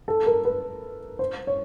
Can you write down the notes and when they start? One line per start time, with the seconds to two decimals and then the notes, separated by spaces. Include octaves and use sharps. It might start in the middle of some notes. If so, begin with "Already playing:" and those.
0.08 A4
0.26 A#4
0.45 B4
1.19 C5
1.47 C#5